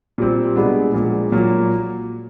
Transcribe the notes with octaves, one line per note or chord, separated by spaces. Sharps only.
A#2 G3 C4
B2 G#3 B3 D4
A#2 F3 G#3
A#2 F#3 A#3